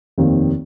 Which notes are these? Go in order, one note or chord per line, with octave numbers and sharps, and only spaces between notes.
F1 D#2 D#3 C4